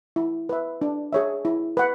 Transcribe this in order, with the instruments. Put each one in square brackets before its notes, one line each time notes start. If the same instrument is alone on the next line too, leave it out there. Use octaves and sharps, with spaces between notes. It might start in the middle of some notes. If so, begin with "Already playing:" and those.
[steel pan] E4
B4 E5
D4
G#4 C#5 E5
E4
B4 F#5